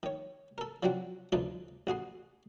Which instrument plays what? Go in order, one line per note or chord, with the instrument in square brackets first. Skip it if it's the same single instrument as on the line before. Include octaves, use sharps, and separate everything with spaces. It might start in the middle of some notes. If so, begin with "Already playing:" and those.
[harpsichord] D#3 C#5
A4 A#4
F3 F#3 C4 D4 F#4
D2 E3 F3 D4 D#4
A1 F#4 G#4 C6